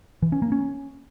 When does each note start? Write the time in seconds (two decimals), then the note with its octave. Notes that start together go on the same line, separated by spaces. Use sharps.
0.22 E3
0.32 C#4
0.42 A#3
0.52 C#4